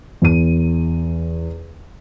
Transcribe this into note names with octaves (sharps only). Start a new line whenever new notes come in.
E2 D#7